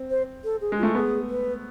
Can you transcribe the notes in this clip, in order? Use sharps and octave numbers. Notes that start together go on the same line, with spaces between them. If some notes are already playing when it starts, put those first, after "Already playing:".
Already playing: C4
C5
A4
G#4
G#3
A3 F4
B3 G#4
B4